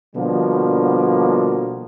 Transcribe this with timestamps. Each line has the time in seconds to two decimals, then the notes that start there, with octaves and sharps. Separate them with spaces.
0.16 B2 D3 F3 G3 A#3